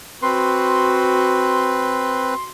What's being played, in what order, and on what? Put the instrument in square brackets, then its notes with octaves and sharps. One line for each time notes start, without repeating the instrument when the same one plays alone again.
[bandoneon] C4 B4 [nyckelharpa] F#4 [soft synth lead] C6